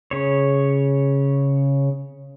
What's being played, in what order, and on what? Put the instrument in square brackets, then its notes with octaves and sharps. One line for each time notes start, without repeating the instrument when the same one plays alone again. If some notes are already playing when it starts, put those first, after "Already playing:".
[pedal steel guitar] C#3 C#5